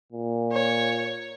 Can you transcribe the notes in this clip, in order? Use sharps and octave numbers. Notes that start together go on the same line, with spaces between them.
A#2
C#5